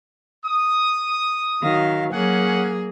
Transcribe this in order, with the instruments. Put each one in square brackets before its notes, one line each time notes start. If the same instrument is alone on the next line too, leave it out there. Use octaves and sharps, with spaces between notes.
[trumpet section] D#6
[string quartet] D#3 F#3 F5
[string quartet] F#3 A#3 G#4 [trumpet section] C#4 F#5